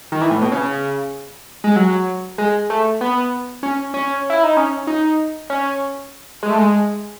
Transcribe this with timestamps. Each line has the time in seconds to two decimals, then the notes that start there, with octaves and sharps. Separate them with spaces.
0.12 D#3
0.21 E3
0.31 A2
0.42 B2
0.52 C#3
1.64 G#3
1.76 F#3
2.38 G#3
2.70 A3
3.01 B3
3.63 C#4
3.94 C#4
4.30 E4
4.44 D#4
4.57 C#4
4.87 D#4
5.50 C#4
6.43 G#3
6.50 A3
6.58 G#3